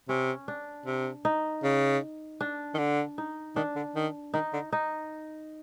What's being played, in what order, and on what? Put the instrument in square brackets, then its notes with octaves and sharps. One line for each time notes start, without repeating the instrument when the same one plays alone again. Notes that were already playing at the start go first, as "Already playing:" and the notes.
[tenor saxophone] C3 [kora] C#4
[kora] D4
[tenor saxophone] C3
[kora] D#4
[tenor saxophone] C#3
[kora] D4
[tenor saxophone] D#3
D3
[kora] D#4
[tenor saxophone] D#3 [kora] D4
[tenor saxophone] D3
D#3
[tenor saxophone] D#3 [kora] D#4
[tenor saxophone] D3
[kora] D#4